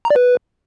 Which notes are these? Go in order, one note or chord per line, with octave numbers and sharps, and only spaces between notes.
A#5
D5
B4